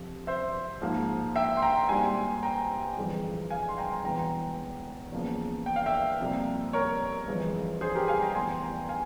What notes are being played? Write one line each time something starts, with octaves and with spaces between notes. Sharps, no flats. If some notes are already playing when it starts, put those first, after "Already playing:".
Already playing: F2 C3 F3
C5 E5
G#1 G#2 F3 A#3
E5 G5
C6
G5 A#5
G#1 G2 G3 A#3 G#5 C6
G5 A#5
G1 F2 E3 G#3
F5 G#5
C6
G5 A#5
E1 E2 E3 G5 A#5
E2 C#3 F3 A#3
G5
F5
E5 G5
F2 C3 G3 A#3
A#4 C#5
G1 F2 E3 G#3
G#4 C5
G4 A#4
F5 G#5
G5 A#5
F1 E2 E3 G#5 C6
G5 A#5
F5 G#5